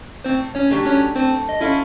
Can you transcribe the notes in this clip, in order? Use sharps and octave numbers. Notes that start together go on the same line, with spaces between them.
A2 C4 C5
C#4 C#5
F#3 A3 D4 G4
C#4 C#5
A3 C4 C5
D#5
C#4 E4 F4 A4 E5